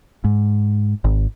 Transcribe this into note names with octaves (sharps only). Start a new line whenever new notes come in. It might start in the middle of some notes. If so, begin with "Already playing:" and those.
G#2
G#1